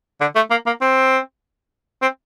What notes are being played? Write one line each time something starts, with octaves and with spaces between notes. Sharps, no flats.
D3
A3
A#3
A#3
C4
C4